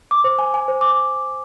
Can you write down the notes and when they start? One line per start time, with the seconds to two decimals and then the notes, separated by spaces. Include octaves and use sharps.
0.11 D6
0.24 C5
0.39 G#5
0.54 G#5
0.68 C5
0.81 D6